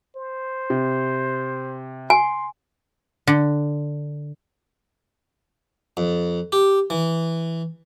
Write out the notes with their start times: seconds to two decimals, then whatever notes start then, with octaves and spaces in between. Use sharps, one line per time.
0.16 C5
0.70 C3
2.10 G#5 C6
3.27 D3
5.97 F2
6.52 G4
6.90 E3